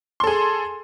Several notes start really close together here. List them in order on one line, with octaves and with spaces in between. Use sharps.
C6 A4 G#4